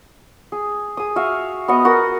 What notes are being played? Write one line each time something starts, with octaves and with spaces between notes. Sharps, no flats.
G#4
G#4 D#6
F#4 E5 F5
B3 F#4 D#5 F#5
F#4 A#4